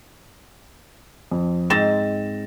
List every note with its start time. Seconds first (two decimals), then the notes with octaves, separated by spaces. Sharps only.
1.31 F2
1.70 G#2 C4 A6 A#6 E7